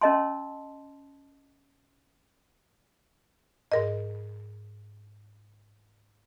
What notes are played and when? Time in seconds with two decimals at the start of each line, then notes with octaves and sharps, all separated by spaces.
0.01 C#4 A#4 D#5 A5 C6
3.72 G#2 A#4 D#5